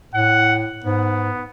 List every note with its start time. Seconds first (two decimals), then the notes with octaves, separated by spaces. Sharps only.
0.14 A2 F#5
0.84 G#2 B3